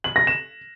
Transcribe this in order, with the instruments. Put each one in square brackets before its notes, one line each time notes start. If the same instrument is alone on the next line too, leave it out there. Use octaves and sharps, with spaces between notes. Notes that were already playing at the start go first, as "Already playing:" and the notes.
[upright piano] F#7
A#6
E7